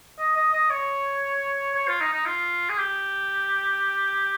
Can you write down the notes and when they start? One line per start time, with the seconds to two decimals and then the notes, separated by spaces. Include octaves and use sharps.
0.19 D#5
0.36 D#5
0.53 D#5
0.70 C#5
1.75 C#5
1.88 F4
2.01 D#4
2.13 D#4
2.26 F4
2.69 G#4
2.78 G4